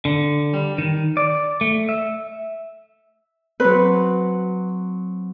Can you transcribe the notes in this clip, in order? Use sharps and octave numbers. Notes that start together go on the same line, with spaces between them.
D3
G3
D#3
D5
A3
E5
F#3 C4 B4